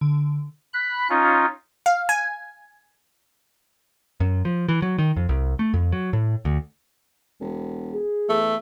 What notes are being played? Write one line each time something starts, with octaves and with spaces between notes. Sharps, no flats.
D3
B5 F#6
C#4 D#4 F4
F5
G#5
F#2
F3
E3
F#3
D#3
F2
C2
A3
F2
F#3
A2
D2
E1
G#4
E2 A3